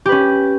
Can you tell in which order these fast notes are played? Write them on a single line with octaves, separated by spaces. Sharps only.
G4 B4 C#4